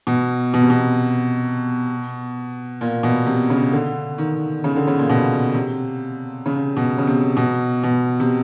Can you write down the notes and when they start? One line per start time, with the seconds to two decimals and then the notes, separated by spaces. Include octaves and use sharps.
0.07 B2
0.54 B2
0.62 C3
0.70 B2
2.81 A#2
3.03 B2
3.26 C3
3.50 C#3
3.73 D3
4.18 D#3
4.64 C#3
4.76 D3
4.88 C#3
4.99 A#2
5.09 B2
5.54 C3
6.46 C#3
6.77 B2
6.98 C#3
7.07 C3
7.37 B2
7.83 B2
8.20 C3